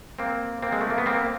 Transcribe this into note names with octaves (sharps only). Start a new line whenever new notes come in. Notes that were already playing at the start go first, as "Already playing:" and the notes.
A#3 C4
A#3 C4
G#3
A3
A#3
B3
A#3 C4